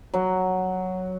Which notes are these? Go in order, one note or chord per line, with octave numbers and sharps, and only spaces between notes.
F#3